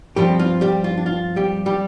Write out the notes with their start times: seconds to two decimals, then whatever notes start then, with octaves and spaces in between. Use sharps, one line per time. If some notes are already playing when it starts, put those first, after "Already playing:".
0.16 G2 F3 G3 C4 G4
0.39 F4
0.61 G3 G4
0.84 F4
0.97 D4
1.06 F4
1.36 G3 G4
1.66 G3 G4